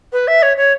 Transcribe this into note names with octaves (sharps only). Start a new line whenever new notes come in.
B4
E5
C#5
C#5